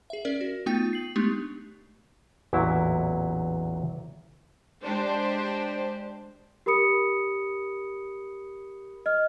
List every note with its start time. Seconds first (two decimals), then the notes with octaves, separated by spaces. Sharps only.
0.10 G#4 E5
0.25 C#4 A#4 D5
0.41 F#4
0.66 A3 B3 D#4 F4 G5
0.93 C7 F#7
1.16 G#3 A3 B3 D4 D#4 G4
2.53 A1 E2 A#2 F#3 E4
4.84 G#3 D4 G4 C5
6.66 G4 A#4 B5 D#6 C#7
9.06 D#5 F6